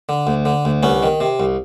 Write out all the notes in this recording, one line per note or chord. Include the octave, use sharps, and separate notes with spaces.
D3
D2
D3
D2
C2 B3 C#4
D#3
C3
C2